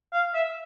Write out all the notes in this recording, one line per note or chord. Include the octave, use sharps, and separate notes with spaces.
F5
E5